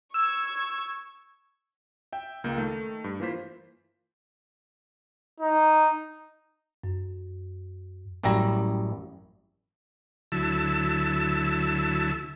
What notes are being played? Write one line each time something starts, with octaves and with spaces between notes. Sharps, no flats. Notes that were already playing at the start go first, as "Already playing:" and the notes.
C#6 E6 G#6
E5 G5
C#2 A#3 G6
D#3 A3
G2
E3 A#3 F4 C5 B6
D#4
F#2
A1 F#2 G3 E4 A#5
D2 F#3 E4 A5 E6